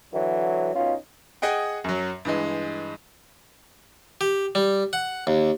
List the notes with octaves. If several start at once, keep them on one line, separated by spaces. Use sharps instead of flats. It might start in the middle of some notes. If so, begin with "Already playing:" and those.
D3 E3 F#3
B2 C#4 D#4 F4
G#4 D#5 F#5 G5
F#2 F#3
G2 E3 G#3
G4
G3
F#5
D#2